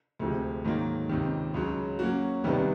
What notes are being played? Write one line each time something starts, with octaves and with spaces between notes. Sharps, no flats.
D2 C3 F3 G#3
G#2 D#3 F#3 A#3
C#2 C3 D#3
C#2 C#3 F#3
F#3 A#3 C#4 F#4
C2 C3 D#3 G3 B3